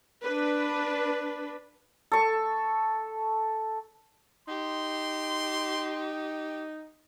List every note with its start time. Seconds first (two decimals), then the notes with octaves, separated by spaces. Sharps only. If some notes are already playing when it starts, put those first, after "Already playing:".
0.22 D4 B4
2.12 A4 C#6
4.48 D#4 G4 C6